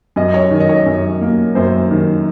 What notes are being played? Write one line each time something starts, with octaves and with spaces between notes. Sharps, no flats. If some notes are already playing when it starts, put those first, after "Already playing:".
F#2 D#5
C#5
D#3
D#5
C#5
F#2
A#3
F#2 C5
D#3